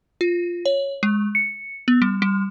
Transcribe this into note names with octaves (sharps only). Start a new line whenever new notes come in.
F4
C#5
G#3
C#7
B3
G3
G3